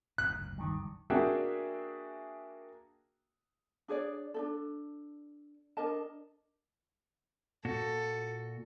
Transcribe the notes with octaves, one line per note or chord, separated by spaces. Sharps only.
F#1 D2 G#2 F#6
G2 D#3
A#3 D4 F#4 G#4 E5 G5
D4 G#4 C#5 D5
D4 D#4 A4
D4 A#4 D#5 A5
A#2 F#4 A4